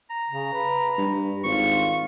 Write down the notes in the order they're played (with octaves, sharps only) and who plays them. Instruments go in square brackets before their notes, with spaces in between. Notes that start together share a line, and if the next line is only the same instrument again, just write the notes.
[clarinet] A#5
[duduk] C#3
B4
[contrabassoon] G2
[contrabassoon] G#1 [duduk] F4 [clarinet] C#6